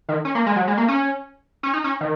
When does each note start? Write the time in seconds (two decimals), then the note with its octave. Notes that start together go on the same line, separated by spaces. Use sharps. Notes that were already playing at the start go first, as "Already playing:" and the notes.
0.09 D#3
0.25 C#4
0.35 A#3
0.46 G#3
0.56 F#3
0.67 G#3
0.77 A#3
0.88 C#4
1.63 C#4
1.73 D#4
1.84 C#4
2.01 D#3